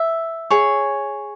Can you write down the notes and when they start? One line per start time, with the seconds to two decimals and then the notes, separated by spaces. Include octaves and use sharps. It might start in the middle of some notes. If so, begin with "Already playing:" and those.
Already playing: E5
0.50 G#4 C#5